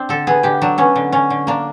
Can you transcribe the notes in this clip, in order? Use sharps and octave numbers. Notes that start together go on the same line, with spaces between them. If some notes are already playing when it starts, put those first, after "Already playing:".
Already playing: C4 D4
D3 A4
B3 G#4
D3 G4
F#3 D4
B3 C#4
D3
D3 C#4
D3
A#3 D4